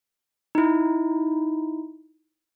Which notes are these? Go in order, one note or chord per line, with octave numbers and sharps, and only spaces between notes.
D#4 E4